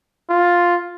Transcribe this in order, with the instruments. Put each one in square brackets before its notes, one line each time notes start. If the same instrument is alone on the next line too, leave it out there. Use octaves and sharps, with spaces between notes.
[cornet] F4